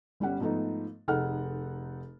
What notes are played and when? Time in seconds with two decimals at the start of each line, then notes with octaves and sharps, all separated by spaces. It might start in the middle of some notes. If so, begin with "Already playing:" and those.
0.20 G1 G3 C#4 F#5
0.40 G#2 F3 A3 B3 D#4
1.08 F1 D#4 G#4 A4 F#5 F6